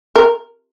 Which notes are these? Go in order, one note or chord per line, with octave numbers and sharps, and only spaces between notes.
A#4